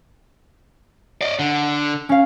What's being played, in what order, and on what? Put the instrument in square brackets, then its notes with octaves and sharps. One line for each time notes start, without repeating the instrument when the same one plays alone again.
[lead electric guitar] D5 D#5
D3
[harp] C#4 F5